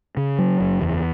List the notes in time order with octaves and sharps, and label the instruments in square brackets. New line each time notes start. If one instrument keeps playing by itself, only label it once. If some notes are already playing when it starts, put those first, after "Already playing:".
[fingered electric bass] C#3
F#3
F#1
E2